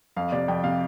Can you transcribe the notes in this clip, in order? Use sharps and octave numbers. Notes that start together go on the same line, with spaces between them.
F2 F5
C3 D5
F2 G5
C3 F5